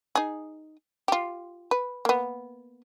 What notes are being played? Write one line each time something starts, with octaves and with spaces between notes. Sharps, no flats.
D#4 G#4
F4 G4
B4
A#3 B3